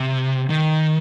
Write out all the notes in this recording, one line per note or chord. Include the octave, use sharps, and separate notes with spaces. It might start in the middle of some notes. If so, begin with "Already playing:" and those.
Already playing: C3
D#3